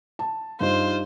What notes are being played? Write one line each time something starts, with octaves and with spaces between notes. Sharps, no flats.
A5
G2 D#4 F4 C5